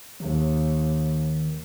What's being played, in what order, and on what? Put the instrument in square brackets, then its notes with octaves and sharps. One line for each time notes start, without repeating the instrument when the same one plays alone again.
[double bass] D#2 [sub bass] D#3